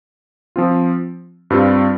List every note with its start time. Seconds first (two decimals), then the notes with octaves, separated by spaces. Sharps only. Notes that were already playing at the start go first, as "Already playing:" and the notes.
0.56 F3 C4 F4
1.50 G2 G3 C4 F4